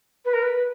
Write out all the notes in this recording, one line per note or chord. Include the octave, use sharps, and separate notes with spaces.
B4
A#4
B4